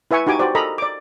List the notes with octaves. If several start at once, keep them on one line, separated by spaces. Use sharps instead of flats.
E4 B4 E5 G#5 C#6
D#4 F#4 G4 G#5 D6
F#4 G4 C5 D5
A4 A#4 D#5 A#5 B5
D5 D6